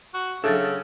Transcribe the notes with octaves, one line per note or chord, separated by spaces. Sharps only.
F#4
C#3 F#3 D4 A4 E5